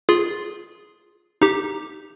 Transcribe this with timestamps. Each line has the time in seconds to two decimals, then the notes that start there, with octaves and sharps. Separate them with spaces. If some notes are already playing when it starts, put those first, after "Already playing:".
0.09 F4 G#4
1.42 D#4 G4